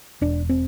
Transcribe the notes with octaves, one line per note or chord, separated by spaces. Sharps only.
E1 D4
C4